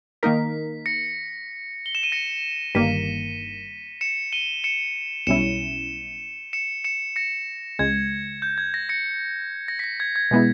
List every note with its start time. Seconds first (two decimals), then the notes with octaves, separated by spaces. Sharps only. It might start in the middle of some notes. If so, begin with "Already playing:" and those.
0.23 D#3 A#3 D#4 A#4 B6
0.86 A#6 C#7
1.86 G7
1.95 E7
2.03 D#7
2.12 A#6 C#7
2.75 G1 G2 D#3 A#3 B6 D#7
4.01 C#7 E7
4.32 D#7 G7
4.64 C#7 E7
5.27 B1 B2 G3 C#4 E4 C#7 E7
6.53 C#7 E7
6.84 C#7 E7
7.16 A#6 C#7
7.79 C#2 C#3 G#3 G#6
8.42 G6
8.58 G#6
8.74 A#6
8.89 A#6 C#7
9.68 A#6
9.79 B6
9.84 A#6
10.00 G#6
10.16 G#6
10.31 B2 G#3 B3 E4